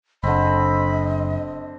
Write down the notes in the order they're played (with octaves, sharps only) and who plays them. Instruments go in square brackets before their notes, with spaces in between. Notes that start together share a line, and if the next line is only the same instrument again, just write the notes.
[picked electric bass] F#1 [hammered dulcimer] D3 C4 [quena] D#5 [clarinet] B5